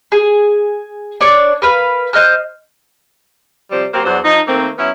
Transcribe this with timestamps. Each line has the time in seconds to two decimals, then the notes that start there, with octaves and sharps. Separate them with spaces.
0.12 G#4
1.21 D4 C#5 D5
1.62 A#4 B4 F5
2.13 C5 D#5 F6 F#6
3.70 C3 F3 G3 C5 D5
3.92 F#3 A#3 C4 G4 C5
4.05 E2 F#3 D4 F#4 C5
4.24 F3 D#4
4.47 D#3 A3 A#3 C4
4.77 F#3 B3 C#4 E4